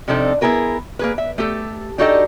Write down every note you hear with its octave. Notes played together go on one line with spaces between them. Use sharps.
C3 F3 C4 D4 D#4 A4
B3 E4 G#4 A#4 B4
A#3 G#4 B4
E5
A3 G4 A4
D4 D#4 F#4 G4 A4 D#5